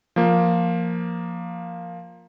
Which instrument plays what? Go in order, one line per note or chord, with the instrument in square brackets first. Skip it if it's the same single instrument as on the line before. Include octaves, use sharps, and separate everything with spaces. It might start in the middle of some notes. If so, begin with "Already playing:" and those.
[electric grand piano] F3 A#3